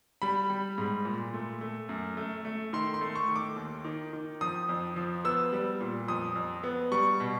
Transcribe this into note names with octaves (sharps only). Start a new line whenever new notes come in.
G3 B5
G3
G#2
A#2
A3
A3
F#2
A3
A3
D#3 C6
C6
A3
C#6
D#3
D6
D#2
D#3
D#3
F3 D#6
F2
F3
B3 E6
G3
A#2
F2 D#6
F2
B3
G3 C#6
B2